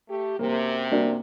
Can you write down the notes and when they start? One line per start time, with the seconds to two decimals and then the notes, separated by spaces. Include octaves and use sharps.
0.10 A3 G4
0.39 F#2 C3 A#3
0.91 A#3 D4 F#4